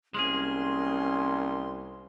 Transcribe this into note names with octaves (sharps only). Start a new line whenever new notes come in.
C2 G#3 A#3 C#4 G#4 C6